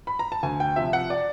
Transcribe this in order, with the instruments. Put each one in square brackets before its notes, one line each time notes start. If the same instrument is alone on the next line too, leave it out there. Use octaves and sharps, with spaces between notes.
[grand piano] B5
A#5
A5
D2 G#5
G5
C3 F3 E5
F#5
D5